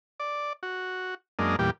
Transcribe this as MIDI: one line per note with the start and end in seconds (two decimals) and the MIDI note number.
0.20 0.53 74
0.63 1.15 66
1.39 1.56 42
1.39 1.56 56
1.39 1.56 58
1.39 1.56 62
1.39 1.56 75
1.59 1.71 40
1.59 1.71 46
1.59 1.71 55
1.59 1.71 67